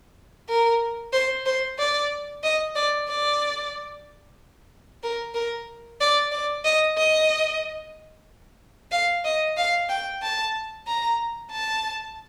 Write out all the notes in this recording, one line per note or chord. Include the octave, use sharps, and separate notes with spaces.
A#4
C5
C5
D5
D#5
D5
D5
A#4
A#4
D5
D5
D#5
D#5
F5
D#5
F5
G5
A5
A#5
A5